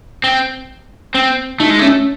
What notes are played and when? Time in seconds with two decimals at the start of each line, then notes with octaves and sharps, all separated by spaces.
0.24 C4
1.15 C4
1.60 A3 D#4
1.70 G#3
1.79 A3 C#4